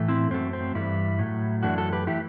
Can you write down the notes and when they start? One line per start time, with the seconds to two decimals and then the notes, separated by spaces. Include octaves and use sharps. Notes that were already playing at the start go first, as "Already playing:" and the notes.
Already playing: A2 E3 A3
0.08 C4 E4
0.30 F#2 F#3 A3 C4
0.53 C4
0.75 G2 E3 G3 E4
1.19 A2 F#3 A3
1.63 F#2 E3 A3 D4 F#4
1.78 F#4 A4
1.93 G4 B4
2.07 E3 A3 E4 G4